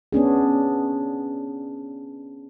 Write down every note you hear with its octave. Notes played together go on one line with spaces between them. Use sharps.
B3 C#4 D4 G#4